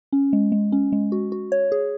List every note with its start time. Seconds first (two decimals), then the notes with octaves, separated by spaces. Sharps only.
0.13 C#4
0.33 G#3
0.52 G#3
0.72 C#4
0.92 G#3
1.12 F#4
1.32 F#4
1.52 C#5
1.72 G#4